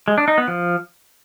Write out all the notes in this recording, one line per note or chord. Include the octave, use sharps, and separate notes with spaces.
G#3
D4
D#4
B3
F3